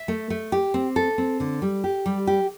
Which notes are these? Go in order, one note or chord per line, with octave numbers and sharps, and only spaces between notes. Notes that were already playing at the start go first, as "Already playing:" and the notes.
Already playing: E5
A3
A3
G4
C4
A4
C4
D3
G3
G4
G3
G4